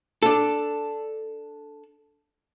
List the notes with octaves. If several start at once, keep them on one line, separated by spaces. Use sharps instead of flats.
D4 A4